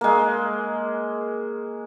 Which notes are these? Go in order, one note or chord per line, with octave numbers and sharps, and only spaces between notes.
G#3 A#3